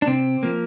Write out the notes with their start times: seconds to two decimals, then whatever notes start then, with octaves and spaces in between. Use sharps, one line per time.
0.02 D4
0.07 C3 C4
0.43 F3 A#3